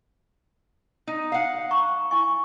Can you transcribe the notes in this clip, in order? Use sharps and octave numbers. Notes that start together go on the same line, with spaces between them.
D#4
F5 F#5
A#5 C#6
E4 G#5 C#6